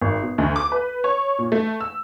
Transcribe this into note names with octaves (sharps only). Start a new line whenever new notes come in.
G#1
B2
D2
D6
B4
C#5
A#2
A3
E6